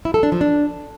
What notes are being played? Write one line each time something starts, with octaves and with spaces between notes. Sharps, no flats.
E4
A4
D4
F3
D4